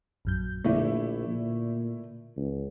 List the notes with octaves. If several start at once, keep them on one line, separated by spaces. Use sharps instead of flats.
A#1 F#2 G6
A#1 B2 D3 A3 E4 D5
A#2
C#2